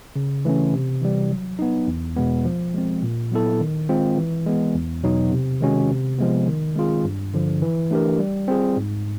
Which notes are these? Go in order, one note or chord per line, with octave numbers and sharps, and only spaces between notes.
C#3
E3 A3 C#4
C3
E3 G3
F#3
B3 D#4
E2
B2 G#3 B3
F3
G#3 C4
A#2
F#3 B3 E4 A4
D#3
G#3 C4 F4
E3
G#3 B3
E2
B2 F#3 B3 D#4
C3
D#3 G#3 C#4 F#4
C3
F3 G#3 B3
D#3
G#3 C4 F4 G#4
G2
D3 F3
E3
A3 D4 G4 A#4
G3
C4 F4 G#4
G#2